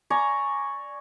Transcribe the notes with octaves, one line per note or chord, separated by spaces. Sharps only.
D5 G#5 A#5 C#6